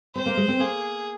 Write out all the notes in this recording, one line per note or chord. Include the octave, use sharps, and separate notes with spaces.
C4 C5
A#3
G#3
C4
A#3 G#4